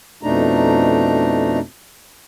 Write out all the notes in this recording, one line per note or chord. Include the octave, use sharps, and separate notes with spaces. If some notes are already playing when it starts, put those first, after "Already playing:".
F2 B2 A3 D4 D#4 A#5